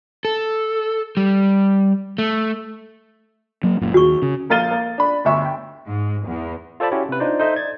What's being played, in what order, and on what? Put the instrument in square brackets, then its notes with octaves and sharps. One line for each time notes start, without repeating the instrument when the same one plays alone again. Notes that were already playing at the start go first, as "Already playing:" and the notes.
[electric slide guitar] A4
G3
A3
[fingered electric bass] F#3 A#3
F#1 F#2 A#2
[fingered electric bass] D#2 [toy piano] F#4 G#4 C#6
[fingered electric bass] C#3
[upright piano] A#1 A#4 F5 A6 D#7 G7
A#3
D4 B5
G1 D2 E5 C#6
G5
[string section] G#2
E2
[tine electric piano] F4 A4 C5 D5 A5 B5
C#4 E4 F#4 G4 C#5
C3 B4
D4 D#4 F4 C5 D5
D#4 A4 C5 D#5 E5
D5 G#6 A6